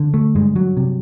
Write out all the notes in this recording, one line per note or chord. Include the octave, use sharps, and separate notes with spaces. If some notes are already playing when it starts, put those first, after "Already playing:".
Already playing: D3
A3
G2 G#3
F#3
C3